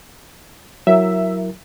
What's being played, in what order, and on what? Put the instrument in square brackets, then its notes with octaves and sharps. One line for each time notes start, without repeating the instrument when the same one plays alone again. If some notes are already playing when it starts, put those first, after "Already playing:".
[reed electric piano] F#3 E4 A#4 [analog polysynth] E5